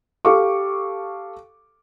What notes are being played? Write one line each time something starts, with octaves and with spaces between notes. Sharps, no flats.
G4 A4 F5 C#6 D6